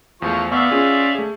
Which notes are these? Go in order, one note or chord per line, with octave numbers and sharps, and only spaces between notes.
E2 F3 A3 C#6
B3 D5 E5 F5 C#6
C#4 F4 G#4
A3 G#4